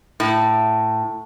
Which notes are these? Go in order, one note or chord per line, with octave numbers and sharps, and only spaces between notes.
A2